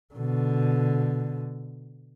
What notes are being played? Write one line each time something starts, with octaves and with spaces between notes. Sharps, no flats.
B2 D3